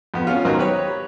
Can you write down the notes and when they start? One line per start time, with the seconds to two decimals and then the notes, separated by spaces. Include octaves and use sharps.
0.14 F2 B3
0.27 C#4 F4
0.45 B1 D#3 F#3 C5 D#5 A#5
0.58 G4 B4 C#5